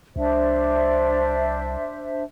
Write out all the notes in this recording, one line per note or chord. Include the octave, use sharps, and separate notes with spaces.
C2 D4 C5 E5